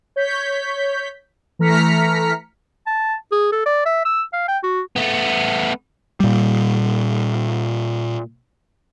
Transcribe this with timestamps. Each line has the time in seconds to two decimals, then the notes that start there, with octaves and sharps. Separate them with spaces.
0.16 C#5 G6 B6
1.59 E3 A3 A#5 F6 B6 C#7
2.87 A5
3.32 G#4
3.52 A4
3.66 D5
3.86 E5
4.05 E6
4.33 F5
4.48 G5
4.63 F#4
4.96 A3 B3
6.20 A#2 G3